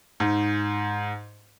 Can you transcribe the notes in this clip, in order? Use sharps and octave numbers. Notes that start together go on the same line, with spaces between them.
G#2